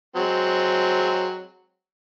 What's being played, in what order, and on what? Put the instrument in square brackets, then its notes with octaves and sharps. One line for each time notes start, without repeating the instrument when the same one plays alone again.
[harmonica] F#3 G#3 C4